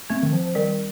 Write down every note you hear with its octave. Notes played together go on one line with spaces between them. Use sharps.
A3 C4
D#3
F3
D#3 G3